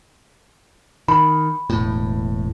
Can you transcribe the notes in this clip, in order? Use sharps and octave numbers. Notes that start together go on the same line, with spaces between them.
D#3 B5
E1 A2